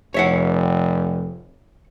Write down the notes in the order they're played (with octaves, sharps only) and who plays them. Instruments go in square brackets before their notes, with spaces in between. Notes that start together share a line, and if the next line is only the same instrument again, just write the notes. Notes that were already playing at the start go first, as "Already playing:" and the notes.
[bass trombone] F1 [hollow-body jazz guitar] C#5 E5 F#5